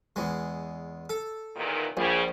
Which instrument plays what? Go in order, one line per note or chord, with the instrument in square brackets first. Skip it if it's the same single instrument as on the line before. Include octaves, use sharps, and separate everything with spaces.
[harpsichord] E2 G#3
A4
[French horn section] E2 A#2 D#3
[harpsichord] A#1 [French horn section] C#3 G3 G#4